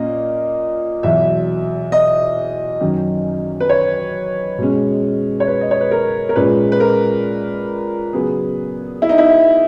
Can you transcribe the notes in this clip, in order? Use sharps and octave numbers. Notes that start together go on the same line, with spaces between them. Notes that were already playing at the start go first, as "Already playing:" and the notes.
Already playing: A#2 A#3 C#4 D#5
E2 B2 F#3 E5
D#5
F#2 D#3 F#3 C#4
B4
C#5
B2 G#3 C#4
C#5
B4
D#5
C#5
B4
A#4
A#4
A#2 G#3 C#4 B4
B4
A#4
C#3 F#3 B3 G#4
E4
D#4
E4